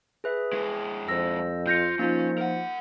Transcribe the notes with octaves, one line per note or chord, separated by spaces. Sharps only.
G#4 B4 E5
G#3 E4 G#4
F2 C5 E6 A#6
F4 G6 A#6 C#7
F3 A#3 C#4 D#4 F4
A#4 F#5